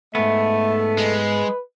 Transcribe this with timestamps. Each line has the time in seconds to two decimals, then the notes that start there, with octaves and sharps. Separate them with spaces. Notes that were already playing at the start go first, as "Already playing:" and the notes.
0.15 G#2 A3 B3 E5
0.98 G#3 B4